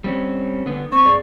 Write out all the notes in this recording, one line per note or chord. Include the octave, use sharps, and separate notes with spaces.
G3 C4 C#4
D3 B3
C4 C#6
G2 G#4 D5